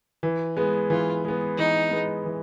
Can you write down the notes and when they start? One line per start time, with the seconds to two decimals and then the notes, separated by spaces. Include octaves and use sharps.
0.23 E3
0.57 G#3 B3
0.90 E3 F4
1.25 G#3 B3
1.57 E3 D#4
1.91 G#3 B3
2.26 E3